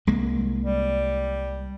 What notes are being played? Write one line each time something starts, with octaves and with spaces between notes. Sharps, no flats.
C2 G#3 A#3
G3